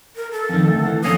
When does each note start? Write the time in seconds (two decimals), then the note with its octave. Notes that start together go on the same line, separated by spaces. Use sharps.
0.16 A#4
0.31 A4
0.49 F2 D#3
0.68 D2
0.86 E3
1.04 F2 A#3 C#4 D#6